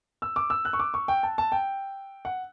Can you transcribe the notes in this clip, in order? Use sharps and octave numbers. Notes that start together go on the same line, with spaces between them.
E6
D6
E6
F#6
C#6
D6
C#6
G5
A5
A5
G5
F#5